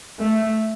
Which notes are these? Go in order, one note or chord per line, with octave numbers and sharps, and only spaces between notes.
A3